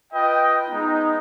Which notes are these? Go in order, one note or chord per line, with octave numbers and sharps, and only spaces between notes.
F4 B4 D#5 G5
G#3 B3 D#4